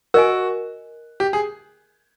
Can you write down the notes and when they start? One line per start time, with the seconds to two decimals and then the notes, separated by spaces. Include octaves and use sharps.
0.14 F#4 A#4 D#5 G#5
1.20 G4
1.33 G#4